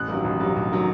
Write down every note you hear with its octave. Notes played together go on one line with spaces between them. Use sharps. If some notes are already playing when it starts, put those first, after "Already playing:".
Already playing: A1 F#6
G2 D#3 F#3
A1
G2 D#3 F#3
A1
D#3 F#3